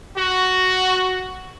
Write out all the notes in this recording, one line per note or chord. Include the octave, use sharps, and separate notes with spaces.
F#4